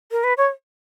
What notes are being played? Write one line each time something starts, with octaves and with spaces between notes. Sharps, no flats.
A#4
B4
C#5